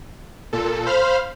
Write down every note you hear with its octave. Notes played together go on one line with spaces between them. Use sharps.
A#2 A4
C5 F5 B5 F6